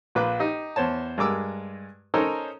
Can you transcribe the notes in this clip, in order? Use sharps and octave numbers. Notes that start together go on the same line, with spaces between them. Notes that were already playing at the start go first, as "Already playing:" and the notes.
A#1 F4 B4 D6 F#6
D#4 G4
E2 C5 C#5 A5
G2 G#3 A#4 D6 E6
C#4 D#4 A4 A#4 C5 C#5